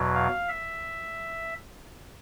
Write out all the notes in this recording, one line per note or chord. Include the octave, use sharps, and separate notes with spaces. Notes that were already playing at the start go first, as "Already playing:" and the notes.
Already playing: E2 B2 F#3
F5
E5